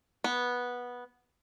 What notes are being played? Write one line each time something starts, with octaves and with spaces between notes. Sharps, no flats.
B3